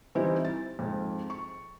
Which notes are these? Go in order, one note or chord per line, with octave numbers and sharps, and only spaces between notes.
E3 G3 C4 D#4 E4
A6
F2 G#2
C#6